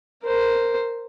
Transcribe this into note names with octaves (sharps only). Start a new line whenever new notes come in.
A#4 C5